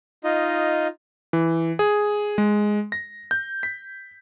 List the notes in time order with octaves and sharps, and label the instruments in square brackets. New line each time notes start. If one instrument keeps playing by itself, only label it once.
[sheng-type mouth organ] D#4 F4 D#5
[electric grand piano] E3
G#4
G#3
A#6
G6
B6